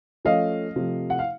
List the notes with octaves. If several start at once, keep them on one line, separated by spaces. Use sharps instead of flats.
F3 A3 C#4 D#5 F5
C3 F3 A3
F#5
F5